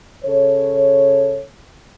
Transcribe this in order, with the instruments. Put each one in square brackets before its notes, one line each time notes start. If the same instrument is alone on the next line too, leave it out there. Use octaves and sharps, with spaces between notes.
[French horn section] C#3 A4 C#5